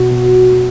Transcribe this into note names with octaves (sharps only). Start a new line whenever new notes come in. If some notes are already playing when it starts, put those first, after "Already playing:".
Already playing: B2 F#4
B2